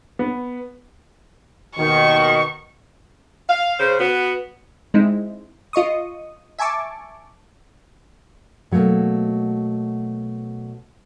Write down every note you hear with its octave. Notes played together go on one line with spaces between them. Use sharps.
B3
D#2 B2 D#3 C#6
F5
C#3 C5
B3 F#4
G#3 C4 D#4 E4
F4 D#5 C#6 D#6
E5 G#5 A5 C#6 D6
B2 F#3 A3 A#3